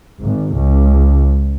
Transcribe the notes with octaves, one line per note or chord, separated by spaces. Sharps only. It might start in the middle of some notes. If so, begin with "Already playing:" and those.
G#1
C#2